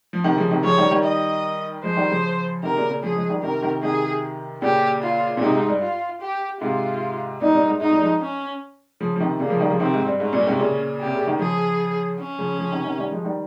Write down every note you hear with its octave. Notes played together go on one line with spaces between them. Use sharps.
F3
C3 D#3
C#3 F3
C3 D#3
C#3 F3 C#5
D#3 G3
D#3 G3
D#5
F3 G#3 C5
D#3 G3
C#3 F3
C3 D#3 A#4
A#2 C#3
A#2 C#3
C#3 F3 G#4
F3 G#3
D#3 G3
C3 D#3 A#4
C3 D#3
C3 D#3 G#4
A#2 C#3 G4
F4
A#2
G#2 C3 D#4
G#2
G2
F4
G4
G#2 C3 F4
G2 A#2 D#4
G2 A#2
G#2
G#2 D#4
G2 A#2
F3 G#3
C#4
C#3 F3
F3
C3 D#3
A#2 C#3 A#3
C#3 F3
D#3 G3
C#3 F3
C3 D#3 C4
G#2
G2
G#2 C#4
G2 A#2
G#2 C3
A#2 C#3
C3 G4
C#3
D#3
C#3 F3 G#4
C#4
C#3 F3
C#3 F3
C3 D#3
C3 D#3
D#3 G3
F3 G#3
D#3 G3